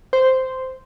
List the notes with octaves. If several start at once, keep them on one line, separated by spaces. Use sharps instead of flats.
C5